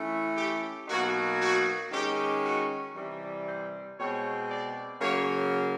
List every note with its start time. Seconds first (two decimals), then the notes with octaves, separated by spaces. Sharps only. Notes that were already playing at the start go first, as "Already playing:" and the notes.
Already playing: E3 A3 C#4
0.37 G4
0.88 B2 F#3 A#3 D#4 F#4
1.40 F#4
1.92 D#3 G#3 C#4 G4
2.43 F#4
2.95 C3 E3 G3
3.46 C5
3.98 B2 G#3 C4 C#5
4.50 D5
5.01 C#3 F#3 A#3 C#5